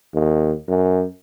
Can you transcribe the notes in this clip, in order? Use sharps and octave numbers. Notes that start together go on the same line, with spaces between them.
D#2
F#2